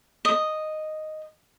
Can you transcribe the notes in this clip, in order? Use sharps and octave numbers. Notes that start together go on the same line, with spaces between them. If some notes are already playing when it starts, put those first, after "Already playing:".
D#5